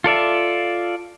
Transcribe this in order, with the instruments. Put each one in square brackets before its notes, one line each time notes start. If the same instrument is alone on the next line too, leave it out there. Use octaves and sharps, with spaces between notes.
[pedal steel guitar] F4 A4 D5 E5